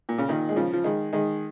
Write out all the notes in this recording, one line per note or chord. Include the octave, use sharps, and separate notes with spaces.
A#2
C#3
A#2 D#3
G#3
C#3 F3
F3
D#3 G#3
D#3 G#3